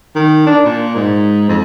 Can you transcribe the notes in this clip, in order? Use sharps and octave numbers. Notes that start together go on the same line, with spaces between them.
D#3
D4
A#2
G#2
F2